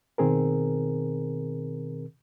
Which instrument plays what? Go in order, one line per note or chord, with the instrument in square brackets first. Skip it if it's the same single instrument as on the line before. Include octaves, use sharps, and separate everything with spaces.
[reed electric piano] B2 D#3 C4 G#4 A#4